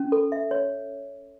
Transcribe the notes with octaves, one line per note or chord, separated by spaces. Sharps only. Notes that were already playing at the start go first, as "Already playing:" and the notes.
Already playing: C#4
A4
E5
C#5